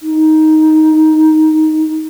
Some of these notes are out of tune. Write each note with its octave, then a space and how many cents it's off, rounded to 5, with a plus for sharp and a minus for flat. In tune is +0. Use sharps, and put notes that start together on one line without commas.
D#4 +10